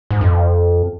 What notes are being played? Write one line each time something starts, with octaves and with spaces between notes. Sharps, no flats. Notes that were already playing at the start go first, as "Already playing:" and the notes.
G#2
F2